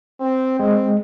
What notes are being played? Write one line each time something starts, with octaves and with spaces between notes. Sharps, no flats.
C4
G#3 C4